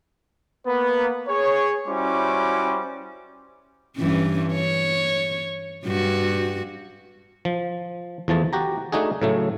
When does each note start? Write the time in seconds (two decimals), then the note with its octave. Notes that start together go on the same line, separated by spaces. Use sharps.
0.67 A#3 B3 B4
1.29 G#4 C#5
1.87 G3 C#4 E4 F#4 C5 D6
3.97 G2 E3 C#4
4.53 C#5
5.85 G2 F#4
7.45 F3
8.28 E2 F3 A3 A5
8.53 F#4 G4 A#5
8.92 A3 D4 D#4 F#4 G#4
9.21 A2 C#3 F#3 A3